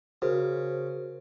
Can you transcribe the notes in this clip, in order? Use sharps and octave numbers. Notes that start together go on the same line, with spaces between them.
C#3 F#4 A#4 C5